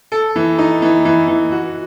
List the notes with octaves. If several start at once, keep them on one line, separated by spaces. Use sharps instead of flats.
A4
E3
D#4
E3
E3
E3
F#4